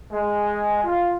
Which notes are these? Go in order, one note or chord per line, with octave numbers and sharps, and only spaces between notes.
G#3
F4